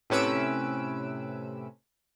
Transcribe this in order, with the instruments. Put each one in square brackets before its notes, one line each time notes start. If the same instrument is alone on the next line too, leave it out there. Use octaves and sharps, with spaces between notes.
[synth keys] A2 C3 C#4 B4 E6 D7